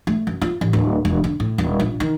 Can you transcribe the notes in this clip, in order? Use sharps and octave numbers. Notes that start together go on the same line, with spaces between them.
A3
F#2
F4
A1
D1
E1
D3
A2
D#1
A#1
D#3